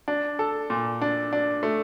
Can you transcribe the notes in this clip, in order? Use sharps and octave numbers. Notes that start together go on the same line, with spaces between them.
D4
A4
A#2
D4
D4
A3